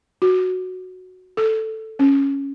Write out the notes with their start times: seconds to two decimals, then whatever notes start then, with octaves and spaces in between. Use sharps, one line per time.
0.22 F#4
1.37 A4
1.99 C#4